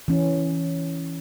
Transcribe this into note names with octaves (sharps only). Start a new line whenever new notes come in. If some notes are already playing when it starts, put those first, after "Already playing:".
E3 C#4